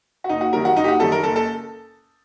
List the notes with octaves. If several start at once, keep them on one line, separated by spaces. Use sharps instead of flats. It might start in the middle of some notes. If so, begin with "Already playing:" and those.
F#4
F#1 D#4
F#4
F#2 D#3 G3 A#4
F#4
F#1 D#4
G4
F#4
F#2 D#3 G3 A4
A#4
F#1 A4
A4